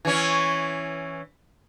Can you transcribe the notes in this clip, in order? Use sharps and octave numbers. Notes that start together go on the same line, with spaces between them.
E3 C#4